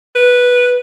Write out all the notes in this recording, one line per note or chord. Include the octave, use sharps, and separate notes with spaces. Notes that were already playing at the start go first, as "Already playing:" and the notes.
B4